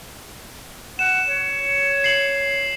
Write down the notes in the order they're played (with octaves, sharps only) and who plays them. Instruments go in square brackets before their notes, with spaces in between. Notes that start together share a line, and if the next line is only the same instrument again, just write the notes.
[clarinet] F#5 [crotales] E7
[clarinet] C#5
[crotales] C7 F#7